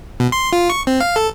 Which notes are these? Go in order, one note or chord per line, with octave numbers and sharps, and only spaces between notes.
B2
C6
F4
C#6
C4
F5
A4